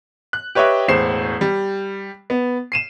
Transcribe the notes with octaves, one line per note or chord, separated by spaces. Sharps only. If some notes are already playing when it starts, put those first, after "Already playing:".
F#6
G4 B4 C#5 D#5 E5 G5
E1 A2 C5 C7 E7
G3
B3
C7 D#7 E7